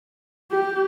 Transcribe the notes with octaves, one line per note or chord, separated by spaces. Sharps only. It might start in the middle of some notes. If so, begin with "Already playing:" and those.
G4